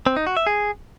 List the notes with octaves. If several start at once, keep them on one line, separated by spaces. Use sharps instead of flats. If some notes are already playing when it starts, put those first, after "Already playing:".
C4
D#4
F#4
E5
G#4